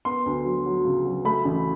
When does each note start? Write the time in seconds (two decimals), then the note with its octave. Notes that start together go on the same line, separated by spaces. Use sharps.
0.05 B3 C6
0.26 D2
0.45 F#3
0.66 F#3
0.85 C#3
1.05 F#3
1.25 A3 B5
1.45 A1